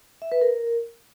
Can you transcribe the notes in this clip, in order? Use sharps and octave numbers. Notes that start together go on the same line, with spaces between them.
E5
B4
A#4